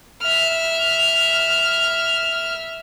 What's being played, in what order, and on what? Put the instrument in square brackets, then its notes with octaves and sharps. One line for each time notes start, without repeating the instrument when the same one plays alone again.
[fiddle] E5 F6